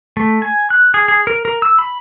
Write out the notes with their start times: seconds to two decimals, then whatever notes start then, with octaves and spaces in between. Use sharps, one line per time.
0.17 A3
0.42 G#5
0.70 F#6
0.94 G#4
1.08 G#4
1.27 A#4
1.45 A#4
1.62 E6
1.79 B5